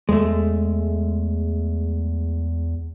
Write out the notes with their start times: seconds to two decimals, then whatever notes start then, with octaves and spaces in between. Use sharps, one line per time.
0.09 E2 G#3 A3